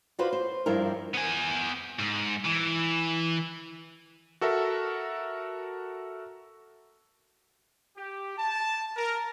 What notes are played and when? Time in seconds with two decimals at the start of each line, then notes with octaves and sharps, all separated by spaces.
0.19 F4 F#4 B4 C5 D5
0.33 C5
0.66 G2 F3 E4 G4 A#4
1.15 B3 G#5
1.99 G#2
2.45 E3
4.41 F#4 A4 A#4 E5
7.97 G4
8.38 A5
8.97 A#4